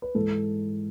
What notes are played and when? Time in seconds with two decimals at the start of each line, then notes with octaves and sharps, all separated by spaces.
0.02 B4
0.14 G#2 E3 G#3 A4